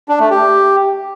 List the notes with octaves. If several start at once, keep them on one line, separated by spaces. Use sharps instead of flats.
D4
A3
G4